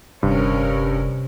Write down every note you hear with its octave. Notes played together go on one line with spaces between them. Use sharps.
F1 G2 C3 C#4 A#4